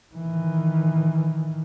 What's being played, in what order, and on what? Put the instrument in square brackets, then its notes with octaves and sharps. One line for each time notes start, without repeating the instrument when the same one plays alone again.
[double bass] D#3 E3